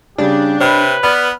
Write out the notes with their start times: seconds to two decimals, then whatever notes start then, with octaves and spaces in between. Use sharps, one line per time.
0.18 C#3 G3 D4 G4
0.60 C3 B4 C#5 B5
1.03 B3 D5 B5 F6